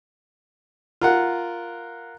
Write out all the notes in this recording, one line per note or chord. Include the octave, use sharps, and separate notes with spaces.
F4 A#4 F#5